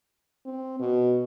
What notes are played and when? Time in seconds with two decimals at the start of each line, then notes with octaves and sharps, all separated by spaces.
0.46 C4
0.79 B2